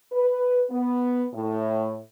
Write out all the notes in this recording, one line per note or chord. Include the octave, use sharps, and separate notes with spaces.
B4
B3
A2